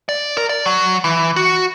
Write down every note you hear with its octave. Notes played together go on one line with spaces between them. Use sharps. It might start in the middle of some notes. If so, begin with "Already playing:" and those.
D5
A#4
D5
F#3
E3
F#4